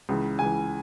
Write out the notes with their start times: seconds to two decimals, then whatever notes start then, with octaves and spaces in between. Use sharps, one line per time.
0.09 C#2 C#3 E3
0.39 C#2 C#3 E3 G#5